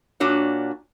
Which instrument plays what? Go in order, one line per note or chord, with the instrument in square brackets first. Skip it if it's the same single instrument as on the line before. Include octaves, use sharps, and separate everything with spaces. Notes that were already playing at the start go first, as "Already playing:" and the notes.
[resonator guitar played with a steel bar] A#2 D4 F#4 C#5